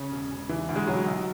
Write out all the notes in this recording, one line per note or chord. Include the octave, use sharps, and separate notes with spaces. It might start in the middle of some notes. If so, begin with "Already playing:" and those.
Already playing: C#3 C#4
E1
E1
E3
D2
G#3
B1 F#3
B1